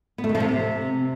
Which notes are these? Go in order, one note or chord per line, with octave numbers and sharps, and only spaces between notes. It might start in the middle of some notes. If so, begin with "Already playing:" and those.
B3
A3
D#3
F3
C3